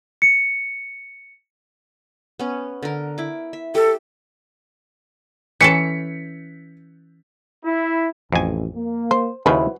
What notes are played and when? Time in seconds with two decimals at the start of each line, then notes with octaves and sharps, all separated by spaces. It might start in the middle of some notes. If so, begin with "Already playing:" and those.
0.22 C#7
2.39 B3 C#4
2.82 D3 A#4
3.18 E4 D6
3.53 E5
3.75 G4 A4
5.61 E3 C#4 A4 B6 C#7
7.65 E4
8.33 A1 F2 G#5
8.76 A#3
9.11 C5
9.46 D#2 C#3 F#3 E4 B4 C5